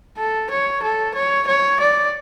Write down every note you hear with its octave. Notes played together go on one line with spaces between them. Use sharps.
A4
C#5
A4
C#5
C#5
D5